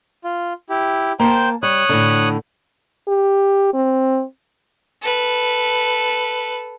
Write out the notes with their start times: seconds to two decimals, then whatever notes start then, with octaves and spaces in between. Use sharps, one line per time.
0.24 F4
0.69 E4 G4
1.20 A#3 C5 G5 A5
1.63 G3 C#5 D#6 F#6
1.89 A2 D3
3.08 G4
3.74 C4
5.01 A4 B4